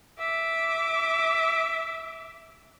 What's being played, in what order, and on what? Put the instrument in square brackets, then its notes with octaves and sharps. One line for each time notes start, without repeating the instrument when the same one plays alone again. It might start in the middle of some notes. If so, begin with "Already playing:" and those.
[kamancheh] E5 D6